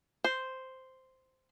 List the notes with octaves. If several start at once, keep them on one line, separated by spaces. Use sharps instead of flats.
C5